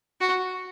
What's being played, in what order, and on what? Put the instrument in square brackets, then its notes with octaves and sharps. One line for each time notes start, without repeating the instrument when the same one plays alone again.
[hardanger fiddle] F#4